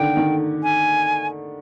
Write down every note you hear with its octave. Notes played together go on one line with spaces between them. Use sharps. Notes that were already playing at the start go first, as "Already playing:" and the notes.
Already playing: D3 D#3 G5
D#3
G#5